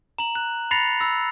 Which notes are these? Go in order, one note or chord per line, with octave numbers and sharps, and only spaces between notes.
A#5 F#7
F#6
B5 A6 A#6 C7 C#7 F7
B5 E6 A#6